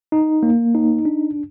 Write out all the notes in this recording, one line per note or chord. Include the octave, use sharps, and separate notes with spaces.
D#4
A#3
D#4
D4